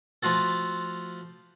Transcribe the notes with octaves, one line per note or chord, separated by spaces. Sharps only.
F3 A3 F4 F#4 A4